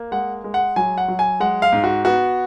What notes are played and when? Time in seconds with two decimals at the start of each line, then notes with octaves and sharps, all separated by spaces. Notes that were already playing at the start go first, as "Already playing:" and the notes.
Already playing: A#3
0.12 G#3 F#5
0.44 G#3
0.54 F#5
0.76 F#3 G#5
0.98 F#5
1.08 F#3
1.19 G#5
1.40 G#3 F#5
1.62 F5
1.73 G#2
1.84 F#4
2.05 B3 F#4